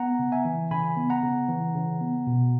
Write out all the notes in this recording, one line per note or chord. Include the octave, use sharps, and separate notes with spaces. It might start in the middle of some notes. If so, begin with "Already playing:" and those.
Already playing: B3 F#5 A#5
C#3
E5 G#5
E3
C#3 G#5 B5
B3
F#5 A#5
C#3
E3
C#3
B3
B2